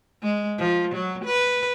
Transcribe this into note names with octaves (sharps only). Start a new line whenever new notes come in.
G#3
F3
F#3
B4